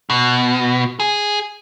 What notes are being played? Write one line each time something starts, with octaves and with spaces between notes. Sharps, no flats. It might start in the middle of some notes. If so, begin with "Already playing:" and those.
B2
G#4